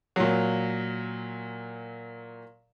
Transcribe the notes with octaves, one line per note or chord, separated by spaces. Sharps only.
A#2 F#3